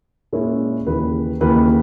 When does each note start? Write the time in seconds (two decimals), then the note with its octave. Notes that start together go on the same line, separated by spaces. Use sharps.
0.33 A#2 G#3 C#4 E4
0.86 D#2 C#3 E3 A#3 B4
1.41 D#2 C#3 E3 A#3 B4